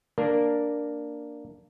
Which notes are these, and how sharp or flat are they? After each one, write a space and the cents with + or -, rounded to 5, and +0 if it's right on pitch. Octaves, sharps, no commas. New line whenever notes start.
A#3 +0 D4 +0 A#4 +0